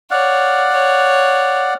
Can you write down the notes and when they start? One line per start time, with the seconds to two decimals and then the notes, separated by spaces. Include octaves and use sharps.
0.11 C#5 D5 F5 F#5
0.72 C#5